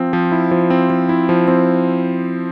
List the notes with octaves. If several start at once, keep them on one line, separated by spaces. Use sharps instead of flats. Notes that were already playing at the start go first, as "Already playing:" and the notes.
Already playing: F3 C4
F3
E4
F3
C4
F3
E4
F3
C4